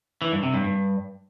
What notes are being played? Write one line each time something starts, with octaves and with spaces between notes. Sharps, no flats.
E3
G2
C3
G2
G2